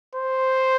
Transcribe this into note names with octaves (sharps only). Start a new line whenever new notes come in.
C5